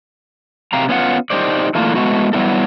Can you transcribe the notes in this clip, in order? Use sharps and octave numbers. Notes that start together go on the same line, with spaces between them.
C3 G4 F5 A#5
B3 C#4 F4 F#5
D#4 G4 C5 D5
E3 A3 A#3 D4 E4 F4
G#3 A3 B3 F#4
F#3 G3 B3 E4 A4